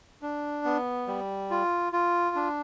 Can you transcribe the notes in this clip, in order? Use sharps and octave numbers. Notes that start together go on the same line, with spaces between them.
D4
B3
G3
F4
F4
D4